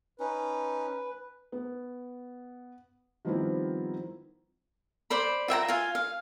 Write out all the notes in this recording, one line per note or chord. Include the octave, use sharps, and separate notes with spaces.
C#4 D#4 B4
B3
D#3 F3 G3 B3 C4 E4
C5 D5 B5
F4 E5 G5 A#5
F4 F5 G#5
F5